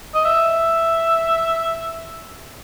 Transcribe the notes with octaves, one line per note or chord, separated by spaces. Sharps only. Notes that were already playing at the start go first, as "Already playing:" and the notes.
D#5
E5